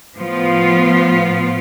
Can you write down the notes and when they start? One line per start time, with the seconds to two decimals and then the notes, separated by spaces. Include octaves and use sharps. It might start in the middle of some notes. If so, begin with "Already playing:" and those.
0.15 A2 F3 B3 F4